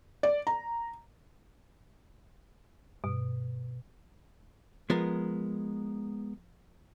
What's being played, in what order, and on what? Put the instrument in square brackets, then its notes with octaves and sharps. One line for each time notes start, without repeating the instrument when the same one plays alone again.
[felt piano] D5
A#5
[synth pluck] G2 [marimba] B2
[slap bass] F3 [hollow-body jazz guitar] G#3 B3 A#4